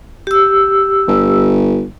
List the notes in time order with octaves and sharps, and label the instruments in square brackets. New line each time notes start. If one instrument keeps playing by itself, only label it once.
[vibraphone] G4 E6
[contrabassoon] G1